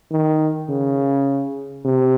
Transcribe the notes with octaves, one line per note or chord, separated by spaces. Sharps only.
D#3
C#3
C3